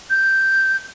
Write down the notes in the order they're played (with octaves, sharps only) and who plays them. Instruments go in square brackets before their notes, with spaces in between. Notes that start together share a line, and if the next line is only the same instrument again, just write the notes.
[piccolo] G6